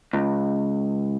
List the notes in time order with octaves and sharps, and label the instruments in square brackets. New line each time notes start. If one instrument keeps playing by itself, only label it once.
[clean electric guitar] C#2